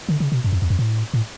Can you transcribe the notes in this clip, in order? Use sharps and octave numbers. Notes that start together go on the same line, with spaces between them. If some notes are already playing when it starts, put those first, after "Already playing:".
D3
C#3
B2
F#2
F2
E2
F2
A2
A2